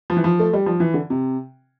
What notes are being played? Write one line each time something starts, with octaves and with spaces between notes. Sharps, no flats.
F3
E3
F3
A3
G3
F3
E3
D3
C3